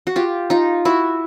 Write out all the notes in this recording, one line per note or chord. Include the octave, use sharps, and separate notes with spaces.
F#4
F4 G4
D#4 F4
E4 F#4